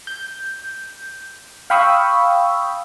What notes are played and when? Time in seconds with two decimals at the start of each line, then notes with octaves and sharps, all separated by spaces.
0.07 G6
1.70 F5 G5 B5 C#6 D#6 E6